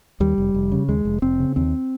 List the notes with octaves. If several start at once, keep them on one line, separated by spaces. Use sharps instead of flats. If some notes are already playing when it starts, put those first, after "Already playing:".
D#2 G3
F1
F1
C#3
D#2 G#3
F1
F1 C4
C#3
D#2 C4